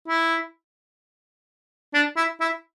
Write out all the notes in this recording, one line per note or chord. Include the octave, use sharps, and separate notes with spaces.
E4
D4
E4
E4